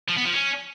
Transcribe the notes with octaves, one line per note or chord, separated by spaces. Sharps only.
F3
B3
F3
C#4